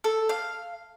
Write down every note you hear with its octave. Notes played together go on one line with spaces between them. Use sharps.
A4
F5